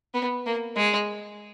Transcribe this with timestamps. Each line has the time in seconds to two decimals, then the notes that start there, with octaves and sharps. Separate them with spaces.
0.14 B3
0.46 A#3
0.77 G#3